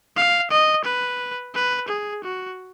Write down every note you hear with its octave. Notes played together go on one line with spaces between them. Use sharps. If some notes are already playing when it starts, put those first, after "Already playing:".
F5
D#5
B4
B4
G#4
F#4